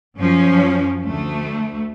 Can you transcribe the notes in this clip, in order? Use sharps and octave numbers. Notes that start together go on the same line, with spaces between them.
F#2 F3 C#4
D2 A3